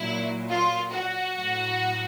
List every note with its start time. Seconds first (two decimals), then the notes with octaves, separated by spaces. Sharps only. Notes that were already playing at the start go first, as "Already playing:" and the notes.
Already playing: A#2 F#3 E4
0.50 F4
0.92 F#4
1.35 A2 F#3